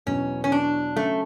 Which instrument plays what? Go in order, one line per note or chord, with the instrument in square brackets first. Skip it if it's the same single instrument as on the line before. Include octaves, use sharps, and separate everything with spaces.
[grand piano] E2 B2 F#3 [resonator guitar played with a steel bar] C#4
[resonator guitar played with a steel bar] C#4
D4
[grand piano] C#3 F#3 C#4 [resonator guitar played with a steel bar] A3